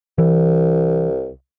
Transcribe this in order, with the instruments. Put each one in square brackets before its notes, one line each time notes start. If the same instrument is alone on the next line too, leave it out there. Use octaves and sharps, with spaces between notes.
[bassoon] C2 [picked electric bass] E3